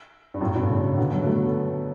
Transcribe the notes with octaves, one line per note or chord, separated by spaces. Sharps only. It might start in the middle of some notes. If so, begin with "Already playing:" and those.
G2
F#2 A2
G2 B2
A2 C#3
B2 D3
D3 F#3
B3
F#3 A3